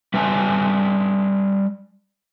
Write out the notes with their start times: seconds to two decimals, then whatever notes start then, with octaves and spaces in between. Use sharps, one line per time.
0.14 G3 B4 E5 G#5 A5